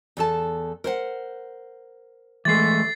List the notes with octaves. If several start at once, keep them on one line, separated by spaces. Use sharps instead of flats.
E2 A4 A5
A#4 C5 F#5
E3 G#3 A3 A6 C7